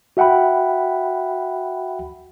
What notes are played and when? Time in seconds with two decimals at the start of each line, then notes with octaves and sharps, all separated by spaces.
0.17 F#4 E5 F#5 G5 B5